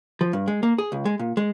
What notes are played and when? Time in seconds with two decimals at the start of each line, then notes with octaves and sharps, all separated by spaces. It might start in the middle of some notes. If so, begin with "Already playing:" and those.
0.21 F3
0.33 G2
0.48 G#3
0.63 A#3
0.78 G#4
0.92 C#2
1.05 G#3
1.19 A#2
1.37 G#3